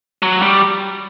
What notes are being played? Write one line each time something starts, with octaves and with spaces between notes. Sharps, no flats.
F#3
G3